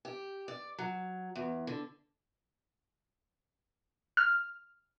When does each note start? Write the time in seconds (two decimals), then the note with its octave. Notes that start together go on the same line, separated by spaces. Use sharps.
0.05 G4
0.48 D5
0.78 F#3
1.35 E2
1.67 D3
4.17 F6